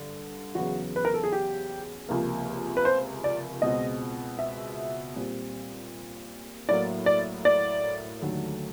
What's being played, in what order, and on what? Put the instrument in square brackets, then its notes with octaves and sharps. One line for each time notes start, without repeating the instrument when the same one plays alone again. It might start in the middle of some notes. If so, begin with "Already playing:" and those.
Already playing: [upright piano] G2 D3
E2 C#3 F#3 B3 F#4
B4
A#4
A4
G#4
G4
C#2 C3 F3 A#3
B4
C5
D5
C#2 B2 G#3 C4 D#5
E5
A#2 G3 C4
A2 F#3 A#3 D5
D5
D5
D#2 D3 F#3 A3